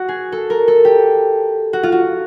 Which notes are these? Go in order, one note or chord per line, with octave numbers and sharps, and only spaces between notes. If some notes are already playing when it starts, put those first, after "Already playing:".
Already playing: F#4
G#4
A4
A#4
A4
G4
F#4
F4
F#4